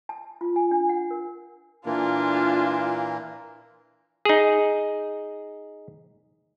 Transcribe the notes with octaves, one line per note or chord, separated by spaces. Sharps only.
A5
F4
G#5
D4
F#5
A#4
A#2 E3 A#3 D4 F4
D#4 G#4